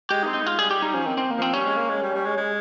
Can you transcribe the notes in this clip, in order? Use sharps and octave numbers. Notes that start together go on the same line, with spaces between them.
G#3 G4
D#4
C4
D#4
G#3 F4
G3 G#4
G3 G4
G3 D#4
F3 C#4
D#3 C4
C4
A#3
F3 C4
G3 C#4
G#3
A#3
G#3
G3
G3
G#3
G#3